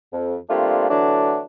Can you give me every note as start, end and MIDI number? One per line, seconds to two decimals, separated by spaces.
0.13 0.36 41
0.50 0.89 55
0.50 0.89 57
0.50 0.89 58
0.50 0.89 60
0.50 0.89 62
0.50 0.89 65
0.90 1.42 50
0.90 1.42 52
0.90 1.42 54
0.90 1.42 57
0.90 1.42 62